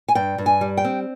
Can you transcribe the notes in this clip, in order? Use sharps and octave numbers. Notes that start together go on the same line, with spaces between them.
G#5
G2 G5
G2
G#5
G3
G5
C4